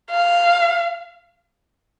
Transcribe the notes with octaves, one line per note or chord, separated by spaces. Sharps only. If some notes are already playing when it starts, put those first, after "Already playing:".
F5